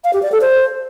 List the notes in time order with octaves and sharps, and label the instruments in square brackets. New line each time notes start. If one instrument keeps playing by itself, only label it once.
[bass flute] F5
G4
D5
A4
C5